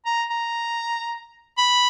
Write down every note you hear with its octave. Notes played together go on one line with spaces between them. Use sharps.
A#5
A#5
B5